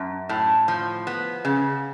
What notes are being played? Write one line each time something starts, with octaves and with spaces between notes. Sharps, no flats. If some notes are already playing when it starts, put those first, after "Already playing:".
Already playing: F#2
A2
F3
B3
C#3